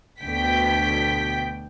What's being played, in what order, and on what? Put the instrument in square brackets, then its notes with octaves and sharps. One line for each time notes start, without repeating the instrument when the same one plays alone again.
[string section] D2 B2 D3 G5 B6